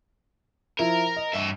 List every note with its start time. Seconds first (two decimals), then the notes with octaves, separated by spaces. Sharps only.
0.79 F3 E4 A#4
1.16 D#5
1.33 G2 E5